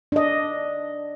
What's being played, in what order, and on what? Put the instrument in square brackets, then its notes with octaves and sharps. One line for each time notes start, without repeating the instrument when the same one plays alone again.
[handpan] D4 D#5